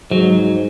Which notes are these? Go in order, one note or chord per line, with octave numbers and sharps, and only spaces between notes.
G#2 F#3